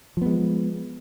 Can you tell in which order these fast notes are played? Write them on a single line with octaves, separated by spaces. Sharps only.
F3 B3 G#3